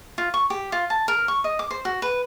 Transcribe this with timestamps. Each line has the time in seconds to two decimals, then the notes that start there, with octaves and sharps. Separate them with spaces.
0.18 F4
0.34 C#6
0.50 G4
0.72 F4
0.90 A5
1.08 A#4
1.28 C#6
1.44 D#5
1.59 D6
1.71 C5
1.85 F#4
2.02 B4